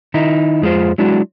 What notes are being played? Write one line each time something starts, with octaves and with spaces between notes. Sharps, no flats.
D#3 D#4 E4
F2 G#3 A3 F4 C5
F#3 G#3 D4 E4 F#4